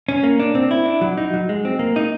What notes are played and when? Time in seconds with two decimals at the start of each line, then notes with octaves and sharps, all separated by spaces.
0.09 C#4
0.23 A#3
0.39 D4
0.55 C4
0.71 E4
0.86 D4
1.01 F#3
1.18 D#4
1.34 F#3
1.49 G#3
1.65 C4
1.79 A#3
1.96 D#4